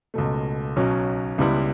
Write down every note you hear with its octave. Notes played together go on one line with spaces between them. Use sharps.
C#2 B2 A3
B1 B2 F#3 C#4
C#2 C#3 G3 B3 E4